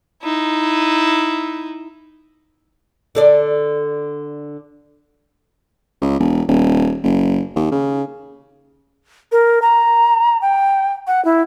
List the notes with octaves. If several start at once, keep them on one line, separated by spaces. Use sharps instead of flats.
D#4 E4
D3 A4 D5
C#2
E1
D#1
F#1
D#2
C#3
A#4
A#5
G5
F#5
E4